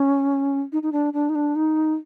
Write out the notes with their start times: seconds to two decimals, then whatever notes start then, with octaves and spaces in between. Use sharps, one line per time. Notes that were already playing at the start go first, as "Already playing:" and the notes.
Already playing: C#4
0.72 D#4
0.83 D#4
0.92 D4
1.13 D4
1.29 D#4
1.35 D4
1.55 D#4